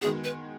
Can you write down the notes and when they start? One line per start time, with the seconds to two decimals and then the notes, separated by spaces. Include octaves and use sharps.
0.01 D#3 G#3 B3 F#4 G#4
0.24 B4